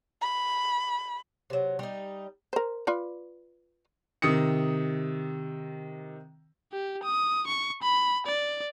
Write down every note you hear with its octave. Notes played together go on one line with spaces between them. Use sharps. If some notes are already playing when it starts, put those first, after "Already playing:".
B5
C3 F#3
G3 D#4
A#4 C5
F4 B4 D5
C3 D#3 D#6 C#7
G4
D#6
C#6
B5
D5